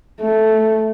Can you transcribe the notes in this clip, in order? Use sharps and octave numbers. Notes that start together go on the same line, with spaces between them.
A3